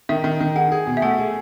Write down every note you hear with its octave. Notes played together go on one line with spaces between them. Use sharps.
D#3 E5
D#3
D#3
G#4 F#5
G#4
B2
E5
A3 F#5
G#4